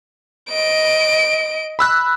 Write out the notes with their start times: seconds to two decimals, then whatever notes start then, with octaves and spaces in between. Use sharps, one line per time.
0.50 D#5 D7
1.79 B5 E6 F#6